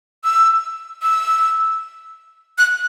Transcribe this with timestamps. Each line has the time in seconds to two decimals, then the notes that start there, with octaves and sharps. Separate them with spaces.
0.24 E6
1.02 E6
2.58 F#6